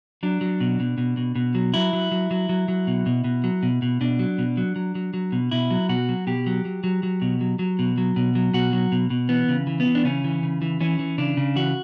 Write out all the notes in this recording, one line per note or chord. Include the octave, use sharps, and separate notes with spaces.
F#3 D4
F#3
B2
B2
B2
B2
B2
F#3
F#3 E4
F#3
F#3
F#3
F#3
F#3
B2
B2
B2
F#3
B2
B2
B2 D4
F#3
B2
F#3
F#3
F#3
F#3
B2
B2 E4
F#3
B2 F#4
F#3
B2 G4
F#3
F#3
F#3
F#3
B2
F#3
F#3
B2
F#3
B2
F#3
B2 F#4
F#3
B2
B2
E3 B3
C#3
E3
B3
E3
D4
C#3 C#4
E3
C#3
E3
E3 C#4
E3
C#3 D4
C#3
E3 F#4